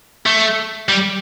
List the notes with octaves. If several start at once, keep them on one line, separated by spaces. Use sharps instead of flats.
A3
G3